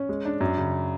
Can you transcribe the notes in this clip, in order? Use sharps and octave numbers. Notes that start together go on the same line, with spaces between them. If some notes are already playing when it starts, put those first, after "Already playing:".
Already playing: C#4
G#3
D4
F#2
C#3